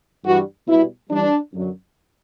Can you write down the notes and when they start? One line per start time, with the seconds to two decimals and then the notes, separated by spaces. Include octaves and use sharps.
0.25 G2 E3 G3 F#4
0.68 B2 G3 E4
1.10 G2 E3 G3 D4
1.53 F#2 D3 F#3